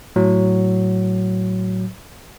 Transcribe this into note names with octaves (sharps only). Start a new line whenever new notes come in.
A2 F#3